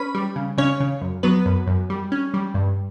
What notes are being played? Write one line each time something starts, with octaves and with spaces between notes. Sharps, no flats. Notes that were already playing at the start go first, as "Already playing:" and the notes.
Already playing: C#4 B4 B5
G3
C#3
C#3 C#4 C#5
C#3
F#2
F#3 B3 B4
F#2
F#2
G3
C#4
G3
G2